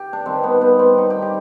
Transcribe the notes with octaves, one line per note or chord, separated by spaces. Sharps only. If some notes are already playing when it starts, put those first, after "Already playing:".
Already playing: G4
D4
G2 D#3 G3 C4
B3
B3
C4
D#4
G4
G4